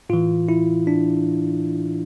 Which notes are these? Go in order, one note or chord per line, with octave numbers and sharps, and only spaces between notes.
A2 E3 F4
E4
D4